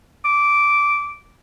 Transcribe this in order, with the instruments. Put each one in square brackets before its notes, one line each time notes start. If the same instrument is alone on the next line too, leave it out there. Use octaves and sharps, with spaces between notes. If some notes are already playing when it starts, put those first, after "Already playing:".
[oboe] D6